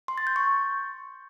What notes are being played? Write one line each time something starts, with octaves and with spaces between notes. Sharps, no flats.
C6
A6
G6
C#6